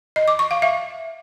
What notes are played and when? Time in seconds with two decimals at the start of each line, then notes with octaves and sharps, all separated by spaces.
0.16 D#5
0.28 D6
0.39 C#6
0.51 F5
0.62 E5